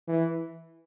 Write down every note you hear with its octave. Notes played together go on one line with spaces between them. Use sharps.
E3